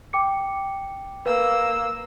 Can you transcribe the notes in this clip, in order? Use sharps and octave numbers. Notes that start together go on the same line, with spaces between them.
G5 D6 C#7
A#3 B4 E6